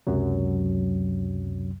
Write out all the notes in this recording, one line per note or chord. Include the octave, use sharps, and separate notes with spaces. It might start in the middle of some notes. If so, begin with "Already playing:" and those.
C#2 F#2 C3 F#3